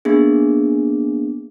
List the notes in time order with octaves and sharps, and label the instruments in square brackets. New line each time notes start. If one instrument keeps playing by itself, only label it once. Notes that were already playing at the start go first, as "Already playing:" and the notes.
[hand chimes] A#3 B3 D4 G#4